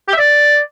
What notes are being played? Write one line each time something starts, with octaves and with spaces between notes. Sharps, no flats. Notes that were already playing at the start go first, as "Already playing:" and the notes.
G4
E5
D5